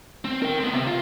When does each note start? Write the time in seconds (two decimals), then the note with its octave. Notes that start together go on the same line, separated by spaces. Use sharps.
0.25 C4
0.42 A#4 G5
0.60 B3 C4
0.73 C3
0.87 F4